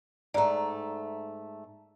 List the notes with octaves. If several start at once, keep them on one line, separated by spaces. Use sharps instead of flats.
G#2 A3 D5 A#5